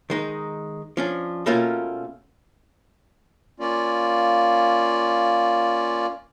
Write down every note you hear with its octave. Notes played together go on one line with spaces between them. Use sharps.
D#3 G#3 D#4
F3 C#4 D4
B2 A3 A#3 C#4 F4
A#3 C#4 F4 D5